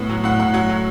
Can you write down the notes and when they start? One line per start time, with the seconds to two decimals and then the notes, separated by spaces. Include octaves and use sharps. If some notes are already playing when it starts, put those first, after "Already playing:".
Already playing: A2 B3
0.10 F#3
0.24 A2 F#5
0.40 A2 F#5
0.54 F#3 F#5
0.69 F#3